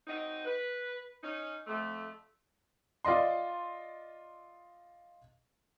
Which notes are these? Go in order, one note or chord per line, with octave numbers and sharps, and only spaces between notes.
F#3 C4 D#4
B4
C#4 D#4
F2 A3
F4 D5 D#5 C6